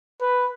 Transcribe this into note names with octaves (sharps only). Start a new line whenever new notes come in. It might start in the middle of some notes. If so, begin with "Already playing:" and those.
B4